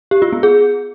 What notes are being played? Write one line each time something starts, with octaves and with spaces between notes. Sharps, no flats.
G4
F4
B3
G#4